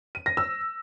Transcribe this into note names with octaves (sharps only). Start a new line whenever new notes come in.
D#7
A#6
E6